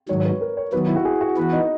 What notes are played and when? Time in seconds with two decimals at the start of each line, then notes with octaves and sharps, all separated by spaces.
0.09 G#2 D#3 F#3 C#5
0.20 C#5
0.25 B4
0.41 A#4
0.57 C#5
0.72 D#3 F#3 B3 B4
0.87 E4
0.96 F#4
1.05 G#4
1.21 F#4
1.37 E3 B3 F#4 B4
1.53 D#4